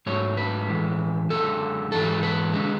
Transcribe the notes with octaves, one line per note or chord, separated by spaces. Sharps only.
G#2 F#3 A3 C#5
B4
A2 E3 G#3
F#2 D3 G#3 A4
G#2 E3 G#3 A4
B4
D3 G#3